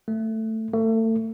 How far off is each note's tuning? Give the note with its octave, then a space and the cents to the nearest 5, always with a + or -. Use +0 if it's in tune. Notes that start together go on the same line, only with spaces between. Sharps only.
A3 +10
A3 +30